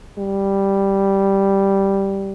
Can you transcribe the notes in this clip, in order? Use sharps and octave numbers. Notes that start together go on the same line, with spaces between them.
G3